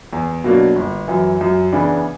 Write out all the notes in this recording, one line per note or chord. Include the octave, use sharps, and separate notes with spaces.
E2
B2 F#3 A#3 D4
G1
F#2 E3
F#2
C#3 E3 B3 D4